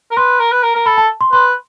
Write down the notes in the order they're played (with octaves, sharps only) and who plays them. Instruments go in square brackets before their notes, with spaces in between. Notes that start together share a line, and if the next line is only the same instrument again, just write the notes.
[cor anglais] A#4
[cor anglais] B4 [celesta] C6
[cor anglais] A#4
B4
A#4
A#4
[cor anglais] A4 [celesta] B5
[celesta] A5
C6
[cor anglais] B4 [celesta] C6